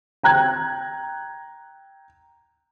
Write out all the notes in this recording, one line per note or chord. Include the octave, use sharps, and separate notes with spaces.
G5 A#5 F#6 G#6